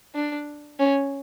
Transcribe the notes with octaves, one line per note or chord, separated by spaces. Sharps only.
D4
C#4